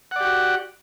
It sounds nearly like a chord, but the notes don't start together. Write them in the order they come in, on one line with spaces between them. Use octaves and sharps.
F#5 D5 G4 F#4